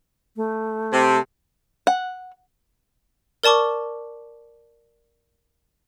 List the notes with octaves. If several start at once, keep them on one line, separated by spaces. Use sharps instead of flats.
A3
C3 A5
F#5
A#4 D5 A5 C#6 D6